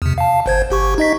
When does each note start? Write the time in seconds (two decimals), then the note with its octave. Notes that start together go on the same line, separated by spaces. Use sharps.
0.02 E2 C3
0.18 F5 A5
0.46 G1 C5 G#6
0.70 G1 G4 C#6
0.98 D#4 D#5 B6